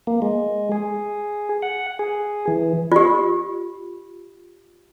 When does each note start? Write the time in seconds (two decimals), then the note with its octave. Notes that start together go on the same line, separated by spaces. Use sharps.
0.07 A#3
0.22 G#3
0.72 G#4
1.62 F#5
1.99 G#4
2.48 E3
2.92 F4 G4